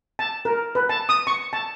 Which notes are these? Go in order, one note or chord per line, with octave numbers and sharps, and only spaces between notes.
A5
A#4
B4
A5
D#6
C#6
A5